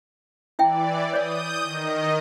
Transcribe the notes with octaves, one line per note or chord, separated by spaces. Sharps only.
E3 E4 D5 E5 G5
C#5 D5 D#6 G6
D#3 D#5